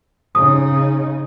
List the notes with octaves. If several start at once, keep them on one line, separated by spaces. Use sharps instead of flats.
C#3 D#4 D#6